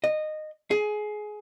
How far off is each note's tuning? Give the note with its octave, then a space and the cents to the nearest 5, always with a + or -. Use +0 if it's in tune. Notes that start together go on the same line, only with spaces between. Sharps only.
D#5 -15
G#4 +20